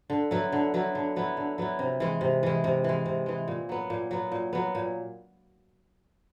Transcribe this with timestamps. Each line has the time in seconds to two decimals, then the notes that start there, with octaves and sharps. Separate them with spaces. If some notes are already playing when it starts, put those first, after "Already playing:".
0.10 D3
0.31 F#3 B3 E4
0.52 D3
0.74 F#3 B3 E4
0.95 D3
1.16 F#3 B3 E4
1.37 D3
1.58 F#3 B3 E4
1.79 C3
2.00 E3 G#3
2.21 C3
2.43 E3 G#3
2.64 C3
2.84 E3 G#3
3.06 C3
3.26 E3 G#3
3.48 A#2
3.69 F#3 B3
3.90 A#2
4.11 F#3 B3
4.32 A#2
4.53 F#3 B3
4.75 A#2